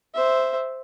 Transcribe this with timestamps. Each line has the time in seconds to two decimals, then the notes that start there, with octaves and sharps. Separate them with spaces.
0.14 C5 E5